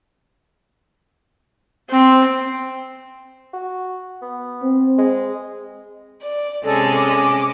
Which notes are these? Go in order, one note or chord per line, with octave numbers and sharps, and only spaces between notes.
C4
F#4
B3
C4
G#3
D5
C3 G#3 C#4 A4
D6